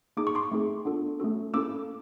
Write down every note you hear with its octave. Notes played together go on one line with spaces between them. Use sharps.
A#3 D#4 G#4 D6
C#6
C6 D6
A3 C4 D#4 G#4
B3 D4 F4 A4
A3 C#4 F#4 A4
A#3 C#4 E4 A4 D6 E6